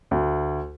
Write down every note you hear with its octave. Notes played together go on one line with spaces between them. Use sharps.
D2